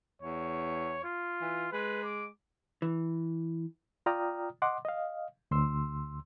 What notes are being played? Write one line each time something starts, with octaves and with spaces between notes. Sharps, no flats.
E2 C#5
F4
E3
G#3 B4
D6
E3
F4 D5 G5 A#5 D#6 F6
D#5 F#5 C6 D6
D#5 F5
D2 C6 E6